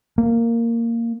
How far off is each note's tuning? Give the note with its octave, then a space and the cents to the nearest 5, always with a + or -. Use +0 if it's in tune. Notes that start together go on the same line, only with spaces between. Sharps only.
A#3 -10